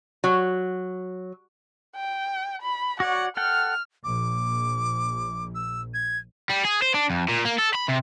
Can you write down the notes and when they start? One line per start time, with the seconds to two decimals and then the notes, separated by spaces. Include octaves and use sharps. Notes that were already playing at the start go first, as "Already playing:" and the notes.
0.24 F#3
1.95 G5
2.62 B5
3.00 F#4 C#5 D5 F#5
3.37 A4 F#5 G5 F6
4.04 A#1 D6
5.55 E6
5.94 G#6
6.50 G3
6.65 G#4
6.82 C5
6.94 D4
7.10 F2
7.29 A#2
7.45 A#3
7.59 A4
7.75 B5
7.89 C3